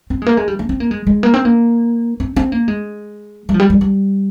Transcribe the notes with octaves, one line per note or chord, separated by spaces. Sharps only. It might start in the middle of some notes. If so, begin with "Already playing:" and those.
C4
G#3
A#3
G#3
G3
A#3
C4
A#3
G#3
G#3
A#3
C4
A#3
C4
C4
A#3
G#3
G3
F3
G3
G3
G3